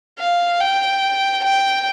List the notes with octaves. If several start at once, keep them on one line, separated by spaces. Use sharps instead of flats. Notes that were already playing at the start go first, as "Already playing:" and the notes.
F5
G5
G5